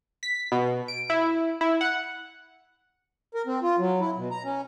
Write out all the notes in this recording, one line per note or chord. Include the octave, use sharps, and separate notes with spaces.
B6
B2
D7
E4
E4
F#5
A#4
C4
F4
F#3
E4
B2
A#5
C#4